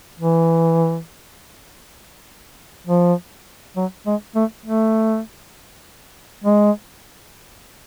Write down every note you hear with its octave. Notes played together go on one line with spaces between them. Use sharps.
E3
F3
F#3
G#3
A3
A3
G#3